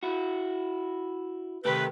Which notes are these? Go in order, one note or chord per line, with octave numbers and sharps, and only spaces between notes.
E4 F#4
C3 D#3 A3 G4 A4 B4